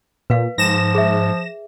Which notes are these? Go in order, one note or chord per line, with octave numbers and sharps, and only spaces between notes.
A#2 B4 F5
G#2 F3 A#6 E7
G#4 E5